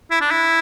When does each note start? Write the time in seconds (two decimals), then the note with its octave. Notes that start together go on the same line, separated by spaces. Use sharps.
0.11 E4
0.21 D4
0.31 E4